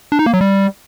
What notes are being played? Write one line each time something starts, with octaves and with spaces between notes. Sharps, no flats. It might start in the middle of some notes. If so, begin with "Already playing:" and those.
D4
D#4
A#3
F#3
G3